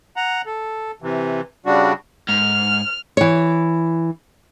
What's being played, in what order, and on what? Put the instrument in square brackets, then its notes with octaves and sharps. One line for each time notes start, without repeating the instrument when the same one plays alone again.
[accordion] F#5 A#5
A4
C3 E3
C#3 G3 D4 F#4
[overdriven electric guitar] G#2 [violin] F6
[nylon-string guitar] E3 C#5